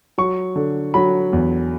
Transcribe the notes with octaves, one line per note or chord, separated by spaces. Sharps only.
F#3 C#6
D3
F#3 B5
E2